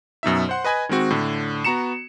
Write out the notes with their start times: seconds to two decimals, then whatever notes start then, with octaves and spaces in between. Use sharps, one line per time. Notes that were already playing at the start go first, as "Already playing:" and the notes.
0.23 F#2 B2 D#4 E5
0.49 C5 F#5 C6
0.64 B4 D#5 G#5 B5 G#6
0.89 D#3 G#3 C4 F#4
1.10 A2 D3
1.64 B3 F#4 A#5 C#7 E7